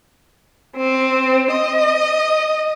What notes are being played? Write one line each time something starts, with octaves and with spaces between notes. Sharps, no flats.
C4
D#5